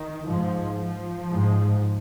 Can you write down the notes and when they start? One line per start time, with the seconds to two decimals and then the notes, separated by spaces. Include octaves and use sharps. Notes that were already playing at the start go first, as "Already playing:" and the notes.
Already playing: D#3
0.27 G#2 F3
0.79 F3
1.32 G#2